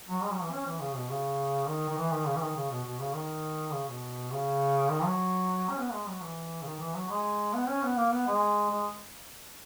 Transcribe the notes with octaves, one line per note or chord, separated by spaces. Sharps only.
F#3
G#3
F#3
E3
C#4
E3
C#3
B2
C#3
D#3
D#3
E3
D#3
C#3
E3
D#3
C#3
B2
B2
C#3
D#3
C#3
B2
C#3
D#3
F#3
C#4
B3
G#3
F#3
E3
C#3
D#3
E3
F#3
G#3
B3
C#4
B3
A#3
B3
G#3
G#3